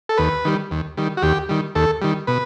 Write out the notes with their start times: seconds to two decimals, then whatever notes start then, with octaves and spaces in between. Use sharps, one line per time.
0.09 A4
0.18 D#2 B4
0.45 D#3 G3
0.71 D#2
0.97 D#3 G3
1.17 F#4
1.22 D#2 G4
1.49 D#3 G3
1.75 D#2 A4
2.02 D#3 G3
2.27 B2 B4